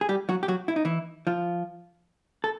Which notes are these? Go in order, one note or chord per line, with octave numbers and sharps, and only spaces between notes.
G#4
G3 G4
F#3 F#4
G4
F#3 F#4
E4
D#4
E3 E4
F3 F4
A4